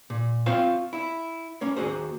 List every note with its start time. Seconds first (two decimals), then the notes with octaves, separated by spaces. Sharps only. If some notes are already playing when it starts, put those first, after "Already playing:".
0.10 A#2
0.46 C4 F4 C5 C#5 E5 F5
0.93 E4 E5
1.61 A#3 C#4 C#5
1.77 D#2 A#3 F#4 G#4 C5